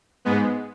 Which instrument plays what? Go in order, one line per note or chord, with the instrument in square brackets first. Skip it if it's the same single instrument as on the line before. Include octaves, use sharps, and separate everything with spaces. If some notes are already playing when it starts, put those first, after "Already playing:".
[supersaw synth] G#2 G#3 B3